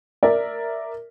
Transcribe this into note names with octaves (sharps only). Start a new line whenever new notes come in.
A#4 D5 E5